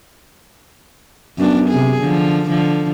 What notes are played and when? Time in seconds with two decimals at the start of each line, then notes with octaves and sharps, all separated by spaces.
1.38 F#2 B3 D4
1.70 C3 G#4
2.01 D3 F3
2.48 D3 F3